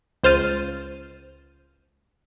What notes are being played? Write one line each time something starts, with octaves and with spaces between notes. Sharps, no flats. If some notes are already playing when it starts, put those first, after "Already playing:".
C#2 C5 F6 A6 D#7